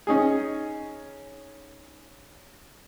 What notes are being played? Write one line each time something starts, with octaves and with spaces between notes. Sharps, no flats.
C#4 D#4 G#4